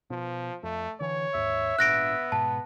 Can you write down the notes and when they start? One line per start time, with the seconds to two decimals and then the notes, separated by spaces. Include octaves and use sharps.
0.10 B2 F3
0.63 F2 A3
1.00 D3 E3 C#5
1.34 D#2 G#2 E5
1.79 G#1 A#2 B3 D4 F#6 A#6 D7
2.32 G#2 B2 A5